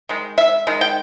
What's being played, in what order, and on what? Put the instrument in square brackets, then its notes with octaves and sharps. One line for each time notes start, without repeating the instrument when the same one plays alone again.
[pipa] D#3 G#3
E5
D#3 G#3
G5